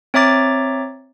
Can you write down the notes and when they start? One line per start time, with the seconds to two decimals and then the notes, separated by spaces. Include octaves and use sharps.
0.14 C4 C#5 E5 A#5 D6 A6